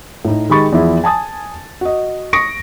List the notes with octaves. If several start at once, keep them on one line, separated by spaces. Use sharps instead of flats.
A2 D#4
D#3 G#3 G4 B5 C#6 A6
E2 F3 E4 G#4
G#5 A5 D#6 A6
F#4 D#5
C#6 D#6 A#6 C#7 D7